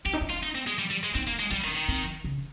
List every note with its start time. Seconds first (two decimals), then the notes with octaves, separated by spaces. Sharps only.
0.05 C#4 G4
0.13 D#4
0.21 C#4
0.30 F4
0.43 D#4
0.55 C4
0.67 G#3
0.78 G3
0.91 G3
1.04 G#3
1.15 C4 D#4
1.27 A#3
1.40 G#3
1.51 G3 C#4
1.64 D#3
1.76 D#3
1.88 C4
2.24 C#3